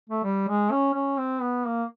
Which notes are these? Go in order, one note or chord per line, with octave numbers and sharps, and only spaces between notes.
A3
G3
G#3
C#4
C#4
C4
B3
A#3